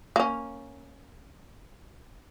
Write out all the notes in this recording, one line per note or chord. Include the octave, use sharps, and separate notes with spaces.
A#3 C#4